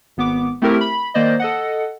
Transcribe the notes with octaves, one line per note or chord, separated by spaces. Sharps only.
G#1 B3 D6
A3 C4 E4 G4 A#4
B5
D#3 A#3 C5 D5 D#5
A4 D#5 F#5